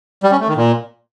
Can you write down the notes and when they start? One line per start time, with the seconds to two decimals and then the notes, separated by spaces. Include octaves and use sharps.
0.23 G3
0.32 C#4
0.40 A3
0.48 D#3
0.57 A#2